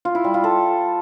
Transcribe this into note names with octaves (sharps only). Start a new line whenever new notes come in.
F4
E4
G3
F4
A4